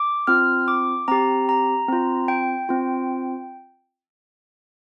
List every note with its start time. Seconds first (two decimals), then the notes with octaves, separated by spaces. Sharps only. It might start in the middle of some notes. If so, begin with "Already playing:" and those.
Already playing: D6
0.27 C4 F4 F6
0.68 D6
1.08 C4 G4 A#5
1.49 A#5
1.88 C4 F4
2.28 G5
2.69 C4 F4